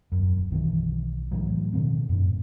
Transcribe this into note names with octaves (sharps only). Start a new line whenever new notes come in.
D#1 F#2
B1 D#3 E3
A2 E3 F#3
B2 D#3 F3 C4
F#2 A2